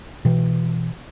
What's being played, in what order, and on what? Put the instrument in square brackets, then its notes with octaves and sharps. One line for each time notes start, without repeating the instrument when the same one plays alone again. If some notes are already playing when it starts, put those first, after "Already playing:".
[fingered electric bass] B2 E3